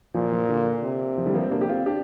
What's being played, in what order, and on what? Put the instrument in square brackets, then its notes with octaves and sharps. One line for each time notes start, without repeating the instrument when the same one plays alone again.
[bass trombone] A#2 [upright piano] F3
[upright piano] F3
D3
[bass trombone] C3
[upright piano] F3
D3 G3
F3 A#3
G3 C4
[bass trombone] D3 [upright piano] A#3 D4
[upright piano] G4
C4 F4
D4 G4